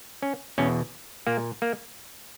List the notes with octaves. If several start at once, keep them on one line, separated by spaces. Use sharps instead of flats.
C#4
E2 B2 C#4
A#2 A#3
A#3